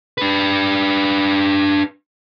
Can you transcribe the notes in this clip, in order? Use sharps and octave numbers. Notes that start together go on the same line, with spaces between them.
D4 B4